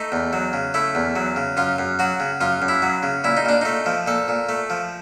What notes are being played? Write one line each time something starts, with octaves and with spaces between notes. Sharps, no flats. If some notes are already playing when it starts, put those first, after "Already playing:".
Already playing: A3 D#4
E2
F#3
C#3
A3 E4
E2
F#3
C#3
F#2 F4
F#2
F#3 F#4
C#3
F#2 F4
F#2
E4
F#3
C#3
A#2 E4
D#4
A#2 D4
A3 D#4
F3
A#2 A4
A#2
A3
F3